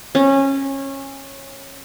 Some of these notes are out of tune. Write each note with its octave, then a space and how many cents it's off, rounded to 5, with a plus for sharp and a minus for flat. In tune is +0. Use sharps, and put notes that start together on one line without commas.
C#4 -20